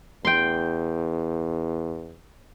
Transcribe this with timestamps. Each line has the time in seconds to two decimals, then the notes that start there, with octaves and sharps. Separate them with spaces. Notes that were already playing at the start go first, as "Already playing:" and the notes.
0.25 E2 G5 C6